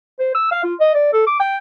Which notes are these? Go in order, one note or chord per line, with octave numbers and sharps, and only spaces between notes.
C5
E6
F5
F4
D#5
D5
A4
D6
G5